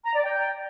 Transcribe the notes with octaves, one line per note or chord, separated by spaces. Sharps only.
A#5
D5
G5